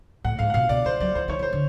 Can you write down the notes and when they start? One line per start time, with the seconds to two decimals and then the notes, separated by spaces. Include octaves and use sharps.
0.24 A2 F#5
0.39 G#2 F5
0.50 F#5
0.54 B2 F5
0.69 B2 D5
0.85 E3 C5
1.00 F#3 D5
1.15 E3 C5
1.28 D#3 C#5
1.39 E3 C5
1.53 D3